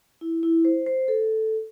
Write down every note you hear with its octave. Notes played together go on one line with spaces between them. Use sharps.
E4
E4
C5
C5
A4